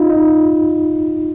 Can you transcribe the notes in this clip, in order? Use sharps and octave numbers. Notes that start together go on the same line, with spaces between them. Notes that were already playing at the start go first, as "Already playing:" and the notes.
Already playing: D#4 F4
D#4